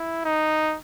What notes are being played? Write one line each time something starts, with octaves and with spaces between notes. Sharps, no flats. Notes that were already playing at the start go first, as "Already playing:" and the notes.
Already playing: E4
D#4